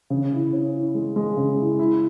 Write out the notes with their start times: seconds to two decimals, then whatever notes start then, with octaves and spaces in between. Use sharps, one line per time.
0.10 C#3
0.32 E4
0.53 C#4
0.74 E4
0.94 G#3
1.16 G#3
1.37 C#3
1.58 E4
1.79 E4